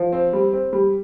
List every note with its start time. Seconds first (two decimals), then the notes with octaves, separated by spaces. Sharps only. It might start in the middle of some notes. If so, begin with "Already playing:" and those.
Already playing: F3
0.12 C4
0.33 G3
0.53 C4
0.73 G3